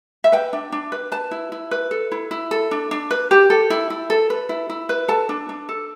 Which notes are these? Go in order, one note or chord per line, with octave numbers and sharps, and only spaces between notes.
E5
B4 G5
D4
D4
B4
B4 A5
E4
E4
B4
A4
E4
E4
A4
D4
D4
B4
G4
A4
E4
E4
A4
B4
E4
E4
B4
A4 A5
D4
D4
A4